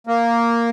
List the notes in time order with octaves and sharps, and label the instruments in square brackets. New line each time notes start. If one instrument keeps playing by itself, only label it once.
[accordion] A#3